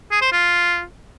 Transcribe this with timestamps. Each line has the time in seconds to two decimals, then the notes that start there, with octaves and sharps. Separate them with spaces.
0.11 G#4
0.22 C5
0.32 F4